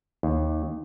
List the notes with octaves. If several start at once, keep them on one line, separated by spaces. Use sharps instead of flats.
D#2